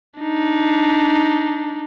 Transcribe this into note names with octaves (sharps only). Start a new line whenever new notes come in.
D4 D#4